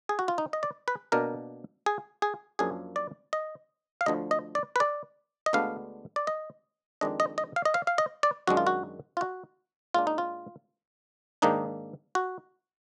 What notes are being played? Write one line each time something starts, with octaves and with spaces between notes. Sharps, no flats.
G#4
F#4
F4
D#4
D#5
D5
B4
B2 A#3 D4 A#4
G#4
G#4
F#2 F3 A#3 D4 G#4
D5
D#5
F5
D2 D3 F3 D#5
D#5
D5
B4
D5
D#5
D2 D3 G#3 B3 D4 F5
D5
D#5
F2 D#3 G#3 D4 D#5
D#5
D#5
F5
D#5
F5
F5
D#5
D5
F#2 D#3 G#3 D4 F#4
F4
F#4
F4
F#4
A#2 G#3 D4 F4
D#4
F4
G#2 D#3 A#3 D4 D#4
F#4